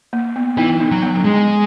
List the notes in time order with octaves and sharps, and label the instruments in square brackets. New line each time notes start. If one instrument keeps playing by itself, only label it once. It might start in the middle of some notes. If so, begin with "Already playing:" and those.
[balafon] A#3
B3
[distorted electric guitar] E3 [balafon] B3 D#4
[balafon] B3 D#4
[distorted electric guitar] F#3
[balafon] B3
[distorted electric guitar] G#3